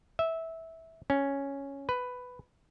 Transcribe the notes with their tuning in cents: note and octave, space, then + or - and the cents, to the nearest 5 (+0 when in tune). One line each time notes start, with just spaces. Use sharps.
E5 -15
C#4 +0
B4 +10